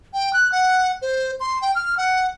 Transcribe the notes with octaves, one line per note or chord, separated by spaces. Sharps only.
G5
F#6
F#5
C5
C6
G5
F6
F#5